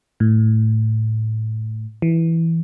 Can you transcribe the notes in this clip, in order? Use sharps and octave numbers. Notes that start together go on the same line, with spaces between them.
A2
E3